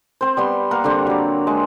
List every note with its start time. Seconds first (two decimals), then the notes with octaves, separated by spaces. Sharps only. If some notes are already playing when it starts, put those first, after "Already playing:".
0.21 C4 C5
0.37 G3 B3 C6
0.71 A#3 A#4 F#5
0.84 D3 G3 C4
1.07 F#3 D5
1.47 G#3